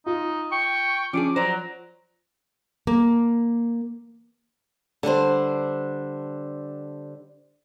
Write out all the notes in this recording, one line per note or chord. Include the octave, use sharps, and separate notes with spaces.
D#4 F4
G5 C#6
F3 C#4 D4 G#4 D6
F#3 C5 D5 A#5
A#3
D3 G3 D4 C5